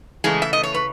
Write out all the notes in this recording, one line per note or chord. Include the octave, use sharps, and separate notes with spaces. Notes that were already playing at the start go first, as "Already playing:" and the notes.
C#3 E3 G#3 A3 G#4
E5
D#5
C#5
B4